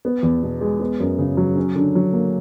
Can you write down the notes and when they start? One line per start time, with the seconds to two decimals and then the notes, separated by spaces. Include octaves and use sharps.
0.05 B3
0.23 E2
0.43 B2
0.61 G#3
0.80 B3
1.00 F#2
1.19 C#3
1.37 F#3
1.56 C#4
1.76 D3
1.95 F#3
2.13 A#3